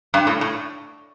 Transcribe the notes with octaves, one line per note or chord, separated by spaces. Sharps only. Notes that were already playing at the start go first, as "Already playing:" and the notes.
G2
A2
A2